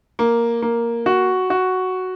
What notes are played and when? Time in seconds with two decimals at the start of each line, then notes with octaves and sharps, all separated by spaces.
0.19 A#3
0.62 A#3
1.06 F#4
1.50 F#4